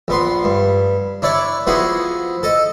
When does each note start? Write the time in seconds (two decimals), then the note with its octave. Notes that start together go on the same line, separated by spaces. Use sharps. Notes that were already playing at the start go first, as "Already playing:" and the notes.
0.08 A#1 B3 C6
0.44 G2
1.22 D4 E4 C#5 D5
1.67 F3 B3 E4 F#4 G#4
2.43 A4 D#5